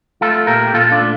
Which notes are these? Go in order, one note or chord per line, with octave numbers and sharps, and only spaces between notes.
A3 F4 A4
A#2 G4 A#4
G4
A#2 F4 A4
D4 F4
A3